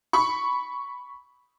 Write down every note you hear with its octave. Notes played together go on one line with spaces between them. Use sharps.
B5 C#6